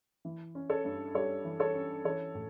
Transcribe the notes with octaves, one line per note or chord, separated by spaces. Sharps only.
E3
C#4
A4 C#5
G2
G3 A4 C#5
E3
A4 C#5
C#4
E3 A4 C#5
A2